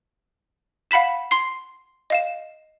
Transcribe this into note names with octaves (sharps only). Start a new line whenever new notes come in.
F5 F#5 B5 B6 E7
C6 C7
D#5 F5 E7